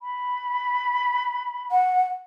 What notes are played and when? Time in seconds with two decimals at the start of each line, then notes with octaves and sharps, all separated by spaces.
0.02 B5
1.71 F#5